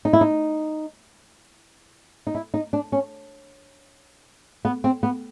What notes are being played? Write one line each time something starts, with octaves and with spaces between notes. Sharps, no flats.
D#4
E4
D#4
D#4
E4
D#4
D4
C#4
B3
C4
B3